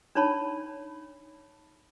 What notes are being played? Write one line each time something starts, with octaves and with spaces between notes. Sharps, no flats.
D4 D#4 C#5 A5 B5